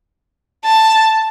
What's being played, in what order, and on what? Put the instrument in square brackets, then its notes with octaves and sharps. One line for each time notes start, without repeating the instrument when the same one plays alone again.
[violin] A5